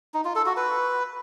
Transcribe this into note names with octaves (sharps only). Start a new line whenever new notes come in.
D#4
F4
A4
F#4
B4